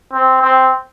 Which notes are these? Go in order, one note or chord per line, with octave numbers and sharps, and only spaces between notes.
C4
C4